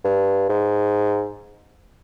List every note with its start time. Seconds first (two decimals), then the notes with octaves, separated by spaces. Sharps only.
0.05 G2
0.49 G#2